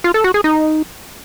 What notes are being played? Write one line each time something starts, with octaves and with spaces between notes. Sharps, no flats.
F4
A4
F#4
G#4
D#4